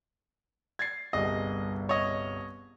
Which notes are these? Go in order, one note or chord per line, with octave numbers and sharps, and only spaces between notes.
G#6 A6 C7
G1 C2 G#4 D#5
C#5 D#5